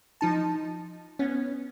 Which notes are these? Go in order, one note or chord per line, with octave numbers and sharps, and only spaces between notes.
F3 D#4 A5
B3 C#4